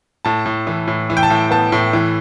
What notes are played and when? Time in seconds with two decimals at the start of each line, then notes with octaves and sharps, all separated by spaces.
0.25 A2 A5
0.46 A2
0.67 E3
0.88 A2
1.10 E3
1.17 G5
1.23 A5
1.30 A2
1.51 B3 A5
1.72 A2
1.93 E3